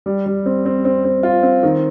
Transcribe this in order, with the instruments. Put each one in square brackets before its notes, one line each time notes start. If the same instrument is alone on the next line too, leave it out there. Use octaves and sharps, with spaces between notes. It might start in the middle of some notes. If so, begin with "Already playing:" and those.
[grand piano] G3
G3
C4
C4
C4
C4
F4
C4
D#3